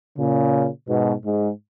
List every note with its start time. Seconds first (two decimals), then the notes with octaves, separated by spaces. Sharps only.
0.18 A#2 C#3
0.88 G#2 B2
1.25 G#2